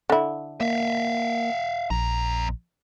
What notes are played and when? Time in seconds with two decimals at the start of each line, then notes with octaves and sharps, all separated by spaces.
0.10 D3 E4
0.61 A#3 E5 F5
1.90 A#1 F2 A#5